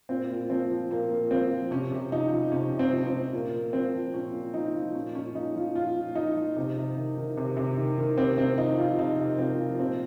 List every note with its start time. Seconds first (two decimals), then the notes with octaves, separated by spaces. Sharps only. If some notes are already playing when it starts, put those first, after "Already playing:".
0.09 A#2 C4
0.30 A#2
0.50 F3 C4
0.70 F3
0.90 A#2 A#3
1.11 A#2
1.31 F3 C4
1.51 F3
1.71 C3 C#4
1.92 C3
2.12 F3 D#4
2.32 F3
2.52 C3 C#4
2.72 C3
2.79 C4
2.92 F3
3.07 C4
3.12 F3
3.33 A#2 A#3
3.53 A#2
3.73 F3 C4
3.94 F3
4.14 A#2 C#4
4.34 A#2
4.54 F3 D#4
4.75 F3
4.95 A#2 C#4
5.15 A#2 C#4
5.35 F3 D#4
5.55 F3 F4
5.75 A#2 F4
5.96 A#2
6.15 F3 D#4
6.36 F3
6.57 C3
6.76 C3
6.97 D#3
7.18 D#3
7.37 C3
7.57 C3
7.78 D#3
7.98 D#3
8.17 C3 C4
8.38 C3 C4
8.58 F3 D#4
8.78 F3 F4
8.99 C3 D#4
9.19 C3
9.39 F3 C4
9.59 F3
9.80 A#2 C4